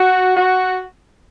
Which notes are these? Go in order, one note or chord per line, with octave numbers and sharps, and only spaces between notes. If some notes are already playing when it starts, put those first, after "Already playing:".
Already playing: F#4
F#4